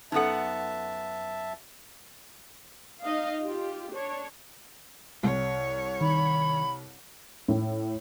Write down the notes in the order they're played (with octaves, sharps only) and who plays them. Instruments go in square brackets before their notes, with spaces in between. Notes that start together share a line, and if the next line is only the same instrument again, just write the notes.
[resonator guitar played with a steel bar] F#2 B3 F#5 [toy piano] D#4 A4 [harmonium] E5 A5
[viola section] D#4 D#5 F5
F4 G4
D4 C#5
[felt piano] C2 [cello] C#5
[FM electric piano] D#3 [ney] B5
[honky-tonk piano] A2